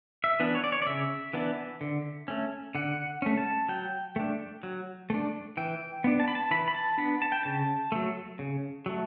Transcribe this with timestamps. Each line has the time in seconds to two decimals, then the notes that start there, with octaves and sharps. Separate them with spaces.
0.24 E5
0.40 E3 B3 D4
0.55 C#5
0.64 D5
0.72 C#5
0.82 D5
0.87 C#3 E5
1.33 E3 B3 D4
1.81 D3
2.28 A3 C#4
2.75 D3 F#5
3.22 A3 C#4
3.38 A5
3.68 F#3 G5
4.16 A3 D4
4.63 F#3
5.10 A3 D4
5.57 E3 G5
6.04 B3 D4
6.20 A5
6.28 B5
6.35 A5
6.51 E3 B5
6.68 B5
6.75 A5
6.98 B3 D4 B5
7.22 A5
7.32 G5
7.43 C#3 A5
7.92 F#3 A3
8.39 C#3
8.86 F#3 A3